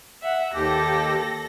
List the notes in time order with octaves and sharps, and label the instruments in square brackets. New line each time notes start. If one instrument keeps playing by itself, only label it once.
[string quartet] E5 F#5
[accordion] D#2 G4 [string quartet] A4 A#6